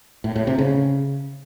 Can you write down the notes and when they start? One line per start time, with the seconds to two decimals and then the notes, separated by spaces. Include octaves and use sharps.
0.24 A2
0.36 A2
0.47 C3
0.59 C#3